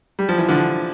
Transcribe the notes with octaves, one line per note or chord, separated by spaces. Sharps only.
G3
F3
E3
D3 F3